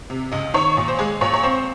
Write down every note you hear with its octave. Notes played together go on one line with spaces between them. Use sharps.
C3
C#2 D#5
D#3 C#5
A#2
C5
G#3 G#4
A#2 C#5
C#5
C4 C5